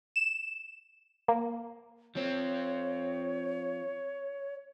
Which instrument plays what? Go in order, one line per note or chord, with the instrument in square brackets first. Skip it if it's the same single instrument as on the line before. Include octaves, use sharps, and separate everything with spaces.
[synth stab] E7
A#3
[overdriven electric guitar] F3 C4 [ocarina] C#5